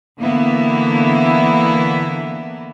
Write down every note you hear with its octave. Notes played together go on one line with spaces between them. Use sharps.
D3 E3 A#3 B3 E4